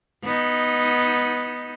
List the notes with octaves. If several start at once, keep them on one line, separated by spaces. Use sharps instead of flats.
B3 D#4